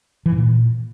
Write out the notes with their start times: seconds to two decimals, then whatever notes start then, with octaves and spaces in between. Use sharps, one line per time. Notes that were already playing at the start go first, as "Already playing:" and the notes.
0.26 E3
0.32 G#2
0.38 A#2